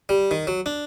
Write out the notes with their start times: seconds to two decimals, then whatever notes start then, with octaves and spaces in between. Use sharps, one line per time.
0.09 G3
0.31 D#3
0.47 F#3
0.66 D4